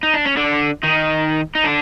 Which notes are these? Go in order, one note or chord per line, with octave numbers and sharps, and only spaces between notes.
D#4
D4
C#4
D3 D4
D#3 D#4
D#4
D3 D4